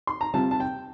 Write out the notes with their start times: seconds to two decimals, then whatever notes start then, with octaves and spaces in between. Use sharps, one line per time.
0.07 C6
0.21 A#5
0.34 C3 G3 C4 F4 A5
0.51 A5
0.60 G5